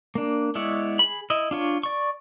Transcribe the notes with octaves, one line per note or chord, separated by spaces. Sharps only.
A#3 D4
G#3 B3 E4 C#5 D5
G#4 B5
E4 D#5
D4 F4 C#5
D5 C#6